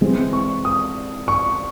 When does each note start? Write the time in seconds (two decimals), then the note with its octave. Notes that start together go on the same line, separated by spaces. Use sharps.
0.01 E3 G#3 C4
0.33 C#6
0.65 D#6
1.28 C#6